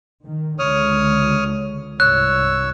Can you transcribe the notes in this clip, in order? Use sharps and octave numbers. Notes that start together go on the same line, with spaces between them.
D#3
C#2 D3 C#5 D#6 F6
C2 G2 C#5 E6 F#6